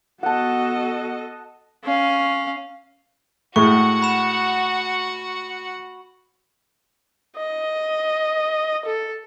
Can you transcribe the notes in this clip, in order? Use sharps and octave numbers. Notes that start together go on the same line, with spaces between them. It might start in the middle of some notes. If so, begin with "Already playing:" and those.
B3 F#4 A4 D#5 F#5 A5
C#4 F5
A2 G#3 F#4 F#5 C#6
B5 E7
D#5
A4